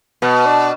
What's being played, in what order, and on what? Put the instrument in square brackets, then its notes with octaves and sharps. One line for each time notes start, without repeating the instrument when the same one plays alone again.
[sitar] B2 [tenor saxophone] B3
[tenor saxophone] D4